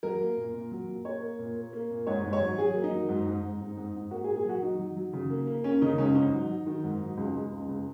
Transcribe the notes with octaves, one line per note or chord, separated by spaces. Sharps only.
F#3 A#4
A#3
A#2
A#2
F#3
A#2
A#3 C#5
A#3
A#2
A#3
A#3
A#2
G#2 C#5
G#2
C#5
F#3
F#3 G#4
A#3
D#4
F#3
G#2
G#2
G#2
G#2
G#2
G#2
A#3 F#4
G#4
A#2
G#4
F#3 F#4
F#3 D#4
F#3
F#3
C#3
A#3
A#3
A#3 C#4
C#3 D#4
C#2 C#4
G#2 D#4
F#3
F#3
D#3
G#2
F#3
C#2
G#3
C#2
C#2